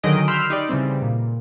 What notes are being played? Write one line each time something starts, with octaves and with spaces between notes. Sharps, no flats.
D3 D#3 F#3 G#4 D#5 D7
B5 C6 E6 F6 G6
D#4 G4 D5
C#3 E3 G3 C4
A#2